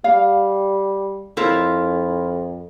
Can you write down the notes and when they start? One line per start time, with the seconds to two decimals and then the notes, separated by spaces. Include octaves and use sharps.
0.04 G3 F5
1.37 F2 E4 F4 A#4 C#5